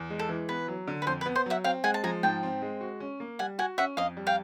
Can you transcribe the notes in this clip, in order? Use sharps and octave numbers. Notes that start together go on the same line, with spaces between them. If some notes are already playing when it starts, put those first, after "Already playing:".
Already playing: E2
G#3
A4
E3
B3 B4
F#3
D3
B4
F2 C5
B4
B3
C5
F#3 E5 F#5
C4 F5 G5
G#3 F#5 G#5
A5
F3 G#5 A#5
G#2 G5 A5
C4
G#3
F#4
C#4
A#3
G3 F#5 G#5
F#4 F#5 G#5
C#4 E5 F#5
F2 D#5 F5
G3
F5 G5